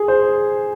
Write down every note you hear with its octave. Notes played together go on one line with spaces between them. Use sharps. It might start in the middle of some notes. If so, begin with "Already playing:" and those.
Already playing: G#4
C5